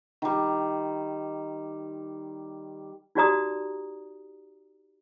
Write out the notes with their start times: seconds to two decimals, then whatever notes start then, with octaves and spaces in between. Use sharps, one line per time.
0.22 D#3 G3
3.15 D#4 F#4 G4 D5 A#5 D#6